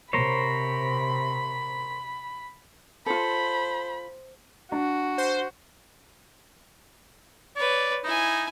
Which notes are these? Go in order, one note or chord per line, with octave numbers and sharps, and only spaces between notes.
C3 A#4 C5 C#5 B5
F4 A4 C5 B5
D4 F#4
C5
B4 C#5 D5
D#4 E4 G#5